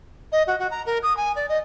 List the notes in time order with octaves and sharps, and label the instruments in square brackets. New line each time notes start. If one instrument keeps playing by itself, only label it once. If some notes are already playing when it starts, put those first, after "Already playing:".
[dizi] D#5
F#4
F#4
A#5
A#4
D#6
G#5
D5
D#5